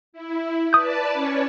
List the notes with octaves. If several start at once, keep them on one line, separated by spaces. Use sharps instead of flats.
E4
B4 D5 A5 D#6 G6
C#4 C#5